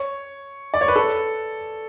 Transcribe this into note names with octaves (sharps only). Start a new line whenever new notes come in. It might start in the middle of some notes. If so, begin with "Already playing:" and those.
Already playing: C#5
D5
C#5
B4
A4